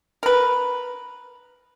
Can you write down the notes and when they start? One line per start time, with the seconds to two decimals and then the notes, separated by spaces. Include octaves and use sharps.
0.23 A#4 B4